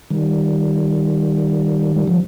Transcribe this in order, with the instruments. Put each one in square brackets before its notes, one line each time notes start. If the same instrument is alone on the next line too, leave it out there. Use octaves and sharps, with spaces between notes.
[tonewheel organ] D#3 G3
G3
F3